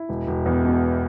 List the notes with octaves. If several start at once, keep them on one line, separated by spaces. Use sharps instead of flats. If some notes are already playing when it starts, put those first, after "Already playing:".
Already playing: E4
E1
E1
E2
B2